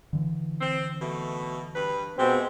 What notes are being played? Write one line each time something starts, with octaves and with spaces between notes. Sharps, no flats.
D3 E3
C4
B2 A3
G2 B4
B2 G#3 A3 C4 G4